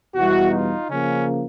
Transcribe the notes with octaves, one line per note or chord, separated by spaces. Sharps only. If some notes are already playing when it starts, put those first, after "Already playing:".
E2 B2 G3 E4 F#4
D#4 F4
C#3 F3 A#3 C#4